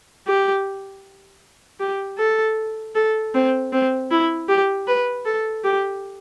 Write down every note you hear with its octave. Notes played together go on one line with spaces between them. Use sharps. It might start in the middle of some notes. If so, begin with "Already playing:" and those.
G4
G4
A4
A4
C4
C4
E4
G4
B4
A4
G4